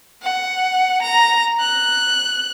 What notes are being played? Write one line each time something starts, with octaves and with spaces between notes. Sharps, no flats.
F#5
A#5
F#6